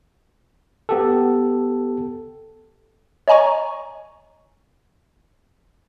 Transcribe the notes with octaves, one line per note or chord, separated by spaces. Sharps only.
B3 G4 A4
C#5 D#5 G#5 A#5 C#6